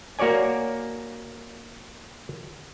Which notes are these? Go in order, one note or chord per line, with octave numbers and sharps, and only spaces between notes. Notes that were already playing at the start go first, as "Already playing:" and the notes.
A#3 F#4 C#5 D5 G#5